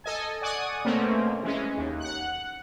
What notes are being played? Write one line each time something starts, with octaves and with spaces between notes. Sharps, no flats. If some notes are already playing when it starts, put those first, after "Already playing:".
A4 D#5 G#5
D5 F#5 G#5 C#6 D#6
B2 A3 A#3 C4 C#4
E3 G#3 C#4
D#2
F#5 F#6